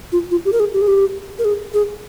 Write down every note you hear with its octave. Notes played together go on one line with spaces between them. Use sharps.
F4
F4
G4
A#4
G#4
G4
G#4
G4
A#4
G#4
G#4